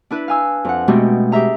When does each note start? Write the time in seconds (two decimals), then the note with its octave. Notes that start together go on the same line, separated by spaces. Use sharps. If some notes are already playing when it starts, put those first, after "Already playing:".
0.11 D4 E4 B4
0.28 F5 G#5 E6
0.65 F2 F#5
0.88 B2 G#3 A3 C4 G4
1.32 G4 G#4 E5 A#5